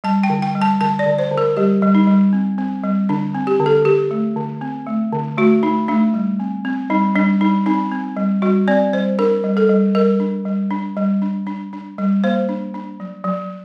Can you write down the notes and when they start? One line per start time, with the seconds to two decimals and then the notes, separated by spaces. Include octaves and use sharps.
0.04 G3 A5
0.24 G5
0.30 D3
0.42 G5
0.55 G3
0.61 A5
0.81 D3 A5
0.99 D5
1.06 D3
1.18 C5
1.31 D3
1.38 A#4
1.57 G3 G4
1.82 G3
1.95 D#4
2.07 G3
2.33 C4
2.58 C4
2.84 G3
3.09 D3 D4
3.35 C4
3.47 G4
3.60 D3
3.66 A4
3.85 D3 G4
4.11 A3
4.36 D3
4.61 C4
4.87 A3
5.12 D3
5.37 A3 F#4
5.63 A3 D#4
5.88 A3 D4
6.14 G3
6.40 C4
6.65 C4
6.90 G3 D#4
7.15 G3 D4
7.41 G3 D#4
7.66 C4 D#4
7.92 C4
8.17 G3
8.42 G3 F#4
8.68 C4 D5
8.93 G3 C5
9.19 D4 A#4
9.44 G3
9.57 A4
9.69 G3
9.95 G3 A#4
10.20 D4
10.45 G3
10.70 D4
10.97 G3
11.22 D4
11.47 D4
11.73 D4
11.98 G3
12.24 A#3 C5
12.49 D4
12.74 D4
13.00 F#3
13.24 F#3